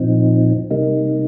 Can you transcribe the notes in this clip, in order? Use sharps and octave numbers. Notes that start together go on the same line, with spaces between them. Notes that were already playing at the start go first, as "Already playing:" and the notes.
Already playing: A#2 F3 C4 D#4
C3 G3 A#3 D#4